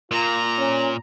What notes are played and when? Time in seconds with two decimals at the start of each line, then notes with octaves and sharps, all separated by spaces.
0.11 A#2 F4 A#5
0.58 C#4